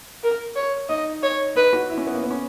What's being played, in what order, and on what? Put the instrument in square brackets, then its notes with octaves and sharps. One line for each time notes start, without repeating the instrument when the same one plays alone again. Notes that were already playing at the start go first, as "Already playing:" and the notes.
[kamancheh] A#4
C#5
[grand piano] D#4 [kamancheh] D#5
[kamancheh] C#5
[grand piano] D#4 [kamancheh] B4
[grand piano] F#4
E4
C#4
B3
A#3
B3
C#4